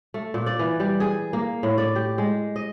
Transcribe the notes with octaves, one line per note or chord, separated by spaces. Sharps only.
A3
A#2
D5
E3
G3
G#4
A#3
A2
D5
G4
G#3
D#5